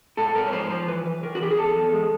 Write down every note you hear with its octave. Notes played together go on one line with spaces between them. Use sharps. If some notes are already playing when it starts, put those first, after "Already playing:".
G#2 A4
G#2 A#4
C#5
F3 C5
F3 C5
E3 B4
E3 B4
E3 A#4
F#4
E3 G4
G#4
E2 A4
E2
G#3